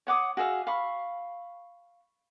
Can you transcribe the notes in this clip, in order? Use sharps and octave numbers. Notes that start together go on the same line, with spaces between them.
C#5 F#5 D6 D#6
F#4 G#4 E5 F5
F5 B5 C#6